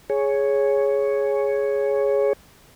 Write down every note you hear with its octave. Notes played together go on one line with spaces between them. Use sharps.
G#4 C#5